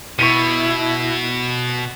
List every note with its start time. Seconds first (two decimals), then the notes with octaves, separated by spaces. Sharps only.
0.19 B2 E4 C#6 B6 D#7